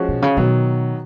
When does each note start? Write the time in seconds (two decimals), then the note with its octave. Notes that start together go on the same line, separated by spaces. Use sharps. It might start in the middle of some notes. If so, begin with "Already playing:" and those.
Already playing: F3 G#3 C#4 F#4
0.09 B2
0.22 C#3
0.37 B2 D#3 F#3 B3